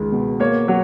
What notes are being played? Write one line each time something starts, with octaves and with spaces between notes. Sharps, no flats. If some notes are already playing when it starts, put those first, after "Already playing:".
Already playing: C#2 D#3 G#3
B2
A#3 C#5
F#3